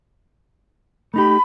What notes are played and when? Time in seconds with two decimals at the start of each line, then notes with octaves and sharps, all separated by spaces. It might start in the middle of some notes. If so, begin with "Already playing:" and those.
1.14 A3 D#4 G4 B5